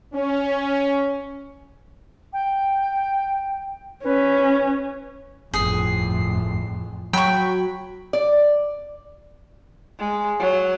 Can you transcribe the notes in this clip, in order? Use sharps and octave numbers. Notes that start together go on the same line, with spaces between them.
C#4
G5
C#4 B4
G1 F2 A2 G#4 C7
F#3 G5 B5 C#6
D5
G#3
F#3